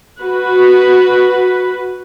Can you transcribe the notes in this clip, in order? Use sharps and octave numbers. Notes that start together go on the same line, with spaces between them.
F#4 B4